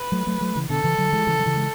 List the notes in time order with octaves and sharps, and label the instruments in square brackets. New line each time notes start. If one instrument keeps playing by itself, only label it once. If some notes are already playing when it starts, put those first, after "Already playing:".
Already playing: [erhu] B4
[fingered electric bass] F#3 A3
F#3 A3
F#3 A3
C#3 E3
[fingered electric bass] B2 D3 [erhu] A4
[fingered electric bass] C#3 E3
D3 F#3
E3 G#3
C#3 E3
F#3
C#3 E3
G#3